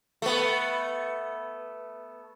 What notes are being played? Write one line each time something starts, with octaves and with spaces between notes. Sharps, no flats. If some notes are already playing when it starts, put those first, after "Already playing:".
A3 B3